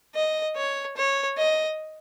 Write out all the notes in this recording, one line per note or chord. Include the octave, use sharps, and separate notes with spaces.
D#5
C#5
C#5
D#5